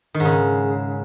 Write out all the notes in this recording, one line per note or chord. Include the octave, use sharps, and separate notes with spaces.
D#3
G#2
C#3